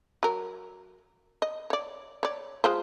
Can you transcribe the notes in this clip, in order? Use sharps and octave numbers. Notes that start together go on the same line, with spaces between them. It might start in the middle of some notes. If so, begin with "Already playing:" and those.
F#3 A#4
D#5
C#5 D5
C#5 D5
G#3 F4 C5